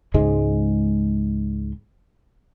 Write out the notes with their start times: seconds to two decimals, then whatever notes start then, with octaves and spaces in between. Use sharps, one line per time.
0.14 C#2 G#2 G#3